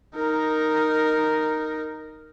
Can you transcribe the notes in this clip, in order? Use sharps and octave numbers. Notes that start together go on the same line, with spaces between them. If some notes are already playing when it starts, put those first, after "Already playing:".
D#4 A#4